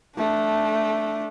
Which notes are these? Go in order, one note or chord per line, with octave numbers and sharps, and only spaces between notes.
A3 D4